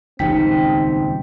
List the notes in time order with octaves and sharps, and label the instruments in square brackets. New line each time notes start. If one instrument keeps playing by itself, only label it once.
[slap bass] D#1 G#1 C#2 [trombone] C4 [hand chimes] D#4 G5 B6